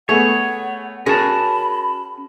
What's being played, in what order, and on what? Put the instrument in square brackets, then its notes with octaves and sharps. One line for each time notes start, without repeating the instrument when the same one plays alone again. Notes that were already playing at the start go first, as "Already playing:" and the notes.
[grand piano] A3 B3 [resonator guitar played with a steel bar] G#4 [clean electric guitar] C#5 [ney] F#5
[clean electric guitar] C#4 A5 [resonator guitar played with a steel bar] F#4 G#4 A#4 [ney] B5 [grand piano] A#6